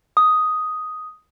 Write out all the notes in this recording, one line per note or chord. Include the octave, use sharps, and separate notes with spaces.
D#6